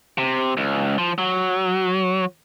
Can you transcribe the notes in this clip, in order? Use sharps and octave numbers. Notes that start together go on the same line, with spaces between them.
C3
C#2
F3
F#3